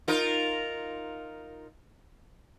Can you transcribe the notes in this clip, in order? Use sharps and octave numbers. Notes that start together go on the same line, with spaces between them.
D#4 F4 A#4